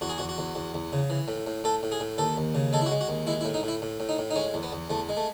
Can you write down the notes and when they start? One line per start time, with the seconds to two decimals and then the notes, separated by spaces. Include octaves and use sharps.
0.01 E2 F#4
0.09 G#4
0.18 E2 F#4
0.29 F#4
0.38 E2
0.55 E2
0.74 E2
0.93 C#3
1.10 E3
1.28 A2
1.47 A2
1.64 A2 A4
1.83 A2
1.92 G#4
2.00 A2
2.18 D#2 A4
2.37 D#2
2.55 C#3
2.73 G#3 A4
2.81 E4
2.86 F#4
2.91 G#3
3.01 F#4
3.09 D#2
3.27 G#3 E4
3.41 E4
3.45 A2
3.54 D#4
3.63 A2
3.68 E4
3.82 A2
4.00 A2
4.09 D#4
4.18 A2
4.31 D#4
4.36 G#3 C#4
4.54 E2
4.63 B3
4.72 E2
4.90 E2 A3
5.09 G#3
5.17 A3